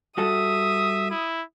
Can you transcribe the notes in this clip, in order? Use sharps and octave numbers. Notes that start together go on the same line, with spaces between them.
G3 F#4 A4 E5 D#6
E4